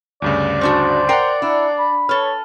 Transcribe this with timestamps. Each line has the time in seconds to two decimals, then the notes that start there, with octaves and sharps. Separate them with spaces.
0.22 D2 G2 C#3 D5
0.61 A3 D4 F#4 C5
1.09 A#4 F#5 G5 A#5 C7
1.42 D4 E4
1.79 B5
2.09 A4 B4 C#5 F6